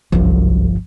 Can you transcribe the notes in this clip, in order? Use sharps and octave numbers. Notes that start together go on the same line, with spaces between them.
G1 C2 F#2 F3